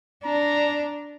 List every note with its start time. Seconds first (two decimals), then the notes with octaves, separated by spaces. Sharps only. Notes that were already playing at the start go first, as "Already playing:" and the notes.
0.25 D4 A#5